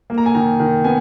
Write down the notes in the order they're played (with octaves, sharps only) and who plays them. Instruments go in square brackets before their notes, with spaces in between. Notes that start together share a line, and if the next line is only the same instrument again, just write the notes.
[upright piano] A#3
A#5
G#5
D#3 A#5
D#3
B3 G#5